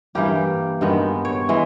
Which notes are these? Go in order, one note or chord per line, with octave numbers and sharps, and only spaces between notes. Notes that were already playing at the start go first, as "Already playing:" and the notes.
G2 E3 G3 A#3 G4
G2 D#3 G#3 B3
C#5
E3 G#3